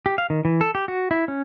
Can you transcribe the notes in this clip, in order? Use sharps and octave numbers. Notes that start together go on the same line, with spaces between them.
G4
F5
D#3
E3
A4
G4
F#4
E4
C#4